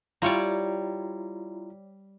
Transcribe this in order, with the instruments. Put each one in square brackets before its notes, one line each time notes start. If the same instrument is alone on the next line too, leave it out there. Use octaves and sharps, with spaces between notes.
[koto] G3 C#5 D5 [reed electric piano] E4 F4 A#5